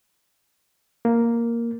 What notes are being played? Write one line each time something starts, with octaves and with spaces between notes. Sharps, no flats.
A#3